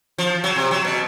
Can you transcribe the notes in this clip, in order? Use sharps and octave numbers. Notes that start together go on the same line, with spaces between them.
F3
F#3
C3
F#3
B2